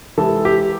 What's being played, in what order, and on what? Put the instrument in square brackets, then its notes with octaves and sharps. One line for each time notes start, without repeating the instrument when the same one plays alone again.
[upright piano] C3 E3 G#3 [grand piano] A4
[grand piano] G4